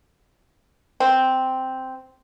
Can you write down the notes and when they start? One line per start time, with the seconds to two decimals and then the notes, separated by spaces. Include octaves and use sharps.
1.00 C4